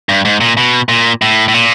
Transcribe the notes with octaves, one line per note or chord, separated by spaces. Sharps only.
G2
G#2
A#2
B2
A#2
A2
A2
A#2